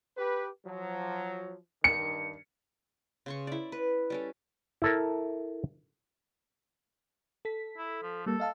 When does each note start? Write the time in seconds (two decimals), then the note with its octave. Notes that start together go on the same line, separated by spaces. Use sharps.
0.17 G4 B4
0.66 F3 F#3
1.84 G2 D#3 C#7
3.26 C#3 C6 C#6
3.47 E4 D5
3.72 B4
4.10 G3 C#4 A4
4.82 E4 A4 A#4
7.45 A4 B6
7.78 E4
8.02 F3
8.26 G3 A#3 A4
8.40 D#5 F5 A5